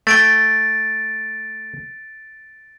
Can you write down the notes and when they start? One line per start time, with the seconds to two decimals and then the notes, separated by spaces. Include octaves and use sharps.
0.07 A3 G5 A6 D7